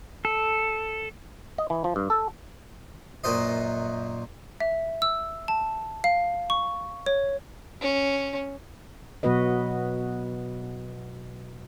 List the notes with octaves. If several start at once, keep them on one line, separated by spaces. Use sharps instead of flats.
A4
D#5
E3
F3
G2
A4
F#2 A#2 B4 C5 D#5
E5
E6
A5
F5
C#6
C#5
C#4
B2 F#3 B3 F#4 B4 D#5